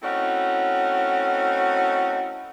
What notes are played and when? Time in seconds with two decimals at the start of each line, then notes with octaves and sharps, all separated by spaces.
0.02 A3 C4 C#4 D#4 E4 F#4